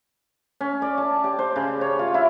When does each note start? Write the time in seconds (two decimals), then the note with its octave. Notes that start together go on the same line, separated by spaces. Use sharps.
0.61 C#4
0.82 D5
0.98 A5
1.24 G4
1.39 C5
1.56 C#3
1.81 C#5
1.99 F4
2.14 E4